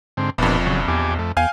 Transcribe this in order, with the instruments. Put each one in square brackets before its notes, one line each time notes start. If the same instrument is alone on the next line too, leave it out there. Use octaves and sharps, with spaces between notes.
[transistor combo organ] G#2 D3 C4
[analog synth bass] E1 [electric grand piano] A#1 F2 [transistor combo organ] A#2 B3 D4
[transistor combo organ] C#3 F#3
[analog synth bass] E2 [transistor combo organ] G4 G#5 D6
[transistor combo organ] F2 A3
[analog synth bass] E2 [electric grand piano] F5 G#5 F6 [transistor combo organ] G5